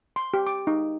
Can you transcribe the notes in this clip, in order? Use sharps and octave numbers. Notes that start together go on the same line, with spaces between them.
C6
G4
D6
D#4